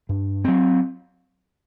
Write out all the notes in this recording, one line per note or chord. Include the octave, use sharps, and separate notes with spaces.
G2
F#3 C4